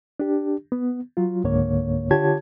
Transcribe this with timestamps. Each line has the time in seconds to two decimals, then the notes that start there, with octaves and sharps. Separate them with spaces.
0.20 D4 G4
0.72 B3
1.17 F#3 F4
1.44 C#2 G#2 D3 A#3 C#5
2.11 D3 F4 G4 C#5 A5 G#6